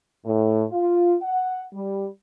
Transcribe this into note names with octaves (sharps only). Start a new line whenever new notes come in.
A2
F4
F#5
G3